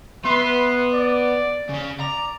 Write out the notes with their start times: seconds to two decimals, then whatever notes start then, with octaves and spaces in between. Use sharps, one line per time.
0.25 B3 B4 E5 C6
0.94 D5
1.69 C#3 C#4
2.00 D5 A#5